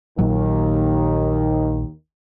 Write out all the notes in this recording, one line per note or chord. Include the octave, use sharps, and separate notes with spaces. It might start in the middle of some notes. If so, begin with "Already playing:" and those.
A#1 D#2 A#2 D#3 F#3